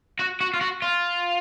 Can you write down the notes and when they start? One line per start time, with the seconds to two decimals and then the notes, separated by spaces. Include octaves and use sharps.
0.19 F#4
0.41 F#4
0.54 F4
0.61 F#4
0.82 F4